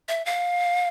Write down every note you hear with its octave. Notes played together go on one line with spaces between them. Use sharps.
E5
F5